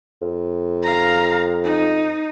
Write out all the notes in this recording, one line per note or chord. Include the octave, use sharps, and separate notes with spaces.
F2
F5 A#5
D#4